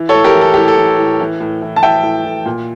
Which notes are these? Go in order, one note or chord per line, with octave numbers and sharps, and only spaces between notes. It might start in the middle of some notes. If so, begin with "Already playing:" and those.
Already playing: E3
A4 C#5
A2
G4 A#4
E3
A4
A2 G4
A4
E3
A2
E3
A2
E3
A5
E3 E5 G5
A2
A2
A#2